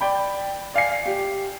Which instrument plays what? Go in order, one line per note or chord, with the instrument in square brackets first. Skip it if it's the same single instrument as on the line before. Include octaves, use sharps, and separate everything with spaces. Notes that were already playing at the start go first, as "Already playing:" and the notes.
[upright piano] D5 G5 B5
D5 F5 G#5 C7
G4